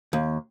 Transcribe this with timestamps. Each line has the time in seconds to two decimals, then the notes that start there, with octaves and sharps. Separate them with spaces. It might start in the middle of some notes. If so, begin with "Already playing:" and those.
0.13 D#2